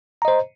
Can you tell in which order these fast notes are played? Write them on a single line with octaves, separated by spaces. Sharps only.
A#5 D#5 C5